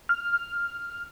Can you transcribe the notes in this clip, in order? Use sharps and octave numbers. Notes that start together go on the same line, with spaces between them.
F6